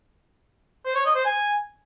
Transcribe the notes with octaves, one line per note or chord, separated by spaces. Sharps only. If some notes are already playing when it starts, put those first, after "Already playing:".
C5
C#5
D#5
C5
G#5